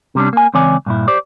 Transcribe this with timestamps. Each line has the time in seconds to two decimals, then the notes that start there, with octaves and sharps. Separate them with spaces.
0.15 C3 G3 C#4 D4
0.33 A#3 G#5
0.54 C#2 E3 C4 C#5 D5 G#5
0.86 G2 A#2 E4
1.08 G4 C5 D5